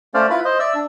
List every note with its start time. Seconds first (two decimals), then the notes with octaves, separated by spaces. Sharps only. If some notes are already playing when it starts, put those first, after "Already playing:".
0.14 A3 C#4 C5 D5 F5
0.30 E4 F4 B4 B5
0.45 C5 D#5
0.59 D5 E5 E6
0.75 D4